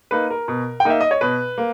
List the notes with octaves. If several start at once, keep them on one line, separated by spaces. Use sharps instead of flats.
A#3 D#4 B4
A#4
B2
G5
A#3 D#4 E5
D#5
C#5
B2 B4
A#3